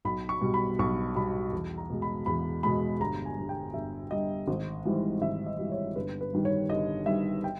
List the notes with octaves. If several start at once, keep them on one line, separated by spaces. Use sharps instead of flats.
B1 B5
C#6
B2 G3
B5
B1 C#6
B2 G3 B5
E2
A#5
B2 G#3
B5
E2 B5
B2 G#3 B5
G1 A#5
G#5
G2 G3
G5
G1 E5
G2 G3 D#5
G#1
G#2 E3 G3
G#1 E5
D#5
G#2 E3 G3
C#5
G1 B4
B4
G2 D#3 G3
C#5
G1 D#5
G2 D#3 G3 E5
G5